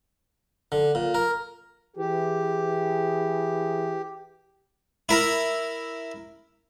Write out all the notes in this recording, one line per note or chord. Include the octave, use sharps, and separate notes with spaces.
D3
A#2
A#4
E3 G4 G#4
E4 A#4